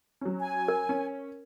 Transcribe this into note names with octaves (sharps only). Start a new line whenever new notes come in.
F#3 C#4
G#5
A#4
C#4